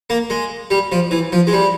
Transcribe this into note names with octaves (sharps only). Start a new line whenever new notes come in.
A#3
G#3
G3
F3
E3
F3
G#3
G3